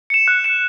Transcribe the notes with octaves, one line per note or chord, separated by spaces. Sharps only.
C#7 E7
F#6
C#7 E7